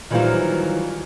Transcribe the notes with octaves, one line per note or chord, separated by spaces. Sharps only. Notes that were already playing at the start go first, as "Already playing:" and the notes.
D#3 E3 F#3 G3 F4 C5